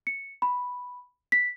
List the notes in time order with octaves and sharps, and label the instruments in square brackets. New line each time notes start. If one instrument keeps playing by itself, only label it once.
[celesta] C#7
B5
B6